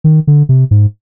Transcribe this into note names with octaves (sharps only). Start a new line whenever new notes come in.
D#3
D3
C3
G#2